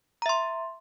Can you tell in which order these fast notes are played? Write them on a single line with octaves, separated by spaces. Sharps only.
A#5 E5 C6